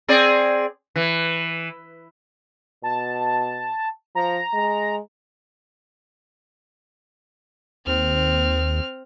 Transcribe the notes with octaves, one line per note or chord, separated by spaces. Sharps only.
C4 G#4 D5
E3
B2 A5
F3 A#5
G#3
D#2 C4 F6